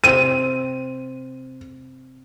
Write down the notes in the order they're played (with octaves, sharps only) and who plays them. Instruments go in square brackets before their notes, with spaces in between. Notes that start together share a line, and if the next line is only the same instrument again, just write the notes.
[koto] C3 C4 [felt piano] D#7